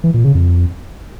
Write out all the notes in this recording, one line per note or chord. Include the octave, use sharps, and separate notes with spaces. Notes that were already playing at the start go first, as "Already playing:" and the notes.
E3
A#2
C#3
F2